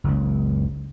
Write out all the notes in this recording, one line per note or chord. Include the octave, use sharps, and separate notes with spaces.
F#1 C#2